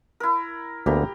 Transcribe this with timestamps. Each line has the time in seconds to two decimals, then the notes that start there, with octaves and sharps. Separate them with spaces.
0.20 E4 A#4
0.86 D2 A#3 B3 G4 A#5